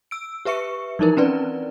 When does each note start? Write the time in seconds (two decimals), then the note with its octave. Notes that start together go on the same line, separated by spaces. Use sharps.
0.11 E6 D7
0.45 G4 B4 E5 C#6 C#7
0.99 E3 F3 D#4 E4 A#4
1.17 C4 C#4 B4 D5